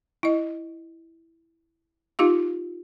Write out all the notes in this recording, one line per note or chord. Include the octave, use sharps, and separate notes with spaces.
E4 D#5
D#4 F4 G4 F5